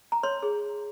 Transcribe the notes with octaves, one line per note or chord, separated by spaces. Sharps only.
A#5
C#5 C6
G#4